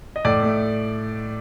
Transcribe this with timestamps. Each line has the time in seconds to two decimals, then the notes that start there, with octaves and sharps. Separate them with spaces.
0.16 D#5
0.25 A2 D5
0.42 A3